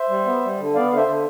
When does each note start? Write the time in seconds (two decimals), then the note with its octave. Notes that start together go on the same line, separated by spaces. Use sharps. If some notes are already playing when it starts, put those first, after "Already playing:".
Already playing: C5 E5
0.09 G3
0.25 B3
0.42 G3
0.58 D3
0.75 B3 D5 F5
0.91 D3 F5
0.96 C5 E5
1.07 D3